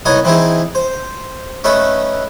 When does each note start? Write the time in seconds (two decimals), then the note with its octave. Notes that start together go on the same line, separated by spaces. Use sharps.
0.05 C2 B3 D#4 C#5 D#5 G#5
0.24 E3 C4 D#4 E4 G#4
0.75 C5
1.64 A3 C#4 D#4 B4 E5